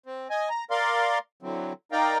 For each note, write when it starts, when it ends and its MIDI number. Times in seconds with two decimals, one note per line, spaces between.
0.06 0.28 60
0.30 0.49 75
0.30 0.49 80
0.49 0.64 82
0.71 1.19 70
0.71 1.19 74
0.71 1.19 77
0.71 1.19 84
1.43 1.73 50
1.43 1.73 52
1.43 1.73 54
1.43 1.73 60
1.92 2.18 63
1.92 2.18 70
1.92 2.18 74
1.92 2.18 77
1.92 2.18 79
1.92 2.18 82